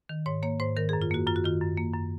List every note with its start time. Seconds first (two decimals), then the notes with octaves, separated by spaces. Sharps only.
0.09 D#3
0.26 G#2 C#5
0.43 A#3 C#5
0.60 G#2 C5
0.77 D#3 A#4
0.89 F#2 G#4
1.02 F4
1.11 A#3 F#4
1.27 F#2 F4
1.36 F#4
1.44 D#3 F4
1.61 F#2
1.77 A#3
1.94 F#2